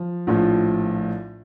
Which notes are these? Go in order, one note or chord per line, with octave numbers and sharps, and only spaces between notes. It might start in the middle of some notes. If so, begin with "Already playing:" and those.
Already playing: F3
A#1 A2 F3